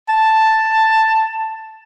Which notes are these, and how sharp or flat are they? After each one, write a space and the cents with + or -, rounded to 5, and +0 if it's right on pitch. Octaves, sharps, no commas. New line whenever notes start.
A5 +5